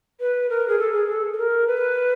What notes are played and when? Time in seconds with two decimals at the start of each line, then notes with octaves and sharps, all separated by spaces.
0.20 B4
0.50 A#4
0.68 G#4
0.79 A4
0.93 G#4
1.08 A4
1.33 A4
1.38 A#4
1.67 B4